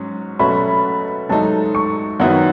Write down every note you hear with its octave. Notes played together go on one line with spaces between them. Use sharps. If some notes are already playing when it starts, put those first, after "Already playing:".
Already playing: G#2 F#3 C#4
B2 F#3 A3 C#4 F#4 B5
G#2 F#3 A3 D#4 A4 A5
C#6
F#2 D#3 F#3 B3 E4 F#5